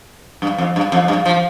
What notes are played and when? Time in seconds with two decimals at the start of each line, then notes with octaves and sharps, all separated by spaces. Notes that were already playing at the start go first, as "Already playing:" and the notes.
0.42 G2
0.58 F2
0.76 G2
0.92 F2
1.08 G2
1.25 F3